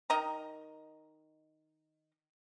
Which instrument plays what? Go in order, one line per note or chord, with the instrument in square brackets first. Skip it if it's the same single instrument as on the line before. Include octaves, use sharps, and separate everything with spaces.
[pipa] D#3 D#5 A#5